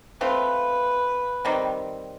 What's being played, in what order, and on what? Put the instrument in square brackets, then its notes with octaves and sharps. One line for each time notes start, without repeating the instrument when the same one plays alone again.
[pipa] A3 C4 F4 [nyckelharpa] B4
[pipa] D#3 G3 C4